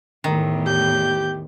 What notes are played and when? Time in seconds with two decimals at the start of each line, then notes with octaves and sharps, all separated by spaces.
0.24 E2 A2 D#3
0.66 G4 G6